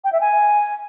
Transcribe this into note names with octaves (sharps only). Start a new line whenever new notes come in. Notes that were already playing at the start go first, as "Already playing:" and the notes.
G5
E5
G#5